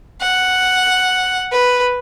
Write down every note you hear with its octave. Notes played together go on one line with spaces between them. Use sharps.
F#5
B4